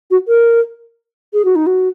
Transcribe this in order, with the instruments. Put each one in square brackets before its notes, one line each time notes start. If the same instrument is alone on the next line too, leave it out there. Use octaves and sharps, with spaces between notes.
[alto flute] F#4
A#4
G#4
F#4
D#4
F#4